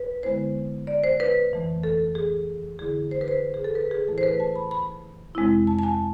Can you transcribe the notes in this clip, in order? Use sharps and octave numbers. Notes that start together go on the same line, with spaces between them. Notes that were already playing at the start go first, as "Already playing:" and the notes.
Already playing: B4
D3 G#3 B3 E4 C5
D5
C5
B4
F2 E3 A3
A4
G#4
D3 A3 E4 G#4
C5
B4
C5
G#4
A4
B4
G#4
A2 E3 A3 E4 A4
C5
B4
A5
B5
B5
F2 C3 G#3 C4 E4
A5
A5
G#5